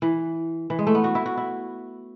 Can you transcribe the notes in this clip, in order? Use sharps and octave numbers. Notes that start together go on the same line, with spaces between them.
E3
E3
G#3
A3
B3
F#4
E4
F#4
E4